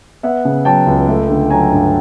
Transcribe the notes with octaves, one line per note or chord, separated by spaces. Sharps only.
B3 E5 F#5
C#3
F#3 G5 A5
C#2
A3
D3
F#3 G#5 A#5
G2